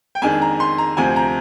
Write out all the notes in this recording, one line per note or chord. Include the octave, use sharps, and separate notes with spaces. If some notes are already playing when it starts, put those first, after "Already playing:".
G5
F2 D#3 G#3 D4 G#5
A#5
C6
A#5
D2 C3 F3 C4 G#5
A#5